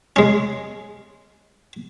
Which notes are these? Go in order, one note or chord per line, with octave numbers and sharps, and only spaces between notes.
G#3 C#4